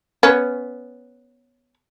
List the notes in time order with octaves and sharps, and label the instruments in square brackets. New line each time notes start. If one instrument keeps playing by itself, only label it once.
[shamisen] B3 C#4